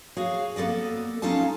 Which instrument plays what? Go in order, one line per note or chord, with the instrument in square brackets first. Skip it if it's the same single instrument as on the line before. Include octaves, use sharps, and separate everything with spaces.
[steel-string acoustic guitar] F#4 G#4 C#5 F5
A#3 B3 A4 D5 D#5
C#4 D#4 F4 A4 A5